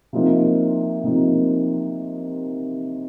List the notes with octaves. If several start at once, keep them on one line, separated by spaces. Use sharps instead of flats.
C3 F3 A#3 D#4
C3 F3 A#3 D#4